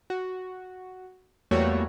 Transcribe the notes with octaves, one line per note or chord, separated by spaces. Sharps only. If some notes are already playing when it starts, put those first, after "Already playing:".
F#4
E2 G3 A3 A#3 F#4 C#5